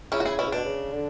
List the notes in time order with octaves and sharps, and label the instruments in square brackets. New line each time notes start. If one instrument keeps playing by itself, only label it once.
[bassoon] C#3 [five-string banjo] C#4 E4
[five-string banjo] F#4
E4 G#4
[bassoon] B2 [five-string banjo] C#4 E4
[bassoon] C#3
[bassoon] B2 [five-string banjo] D4
[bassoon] C#3
D3